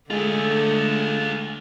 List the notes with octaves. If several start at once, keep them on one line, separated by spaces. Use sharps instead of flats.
D3 G#3 A3 F4 G#4